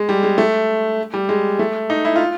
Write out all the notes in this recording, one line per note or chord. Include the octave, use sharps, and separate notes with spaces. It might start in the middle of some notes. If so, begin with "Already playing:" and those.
Already playing: G#3
G3
G#3
A3
G3
G#3
A3
D#4
E4
F4